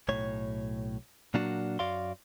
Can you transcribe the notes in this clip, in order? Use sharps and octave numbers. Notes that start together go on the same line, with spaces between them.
B1 A2 C#5
A#2 F#3 A#3 D4 F#4
F#2 F#4 D5 F5 C6